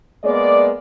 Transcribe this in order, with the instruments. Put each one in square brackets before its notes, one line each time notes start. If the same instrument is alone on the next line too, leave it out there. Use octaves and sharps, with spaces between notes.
[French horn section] G#3 A#3 B3 D5